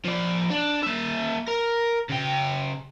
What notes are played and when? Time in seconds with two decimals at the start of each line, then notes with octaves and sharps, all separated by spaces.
0.05 F3 D5
0.50 D4
0.83 A#3 E5
1.47 A#4
2.10 C#3 G5